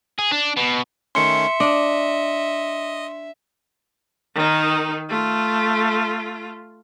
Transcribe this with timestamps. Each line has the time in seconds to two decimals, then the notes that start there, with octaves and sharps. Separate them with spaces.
0.19 G#4
0.32 D4
0.57 B2
1.15 D#3 A3 C#4 E5 C6 C#7
1.60 D4 D#5
4.35 D#3 D#4
5.09 A3 F4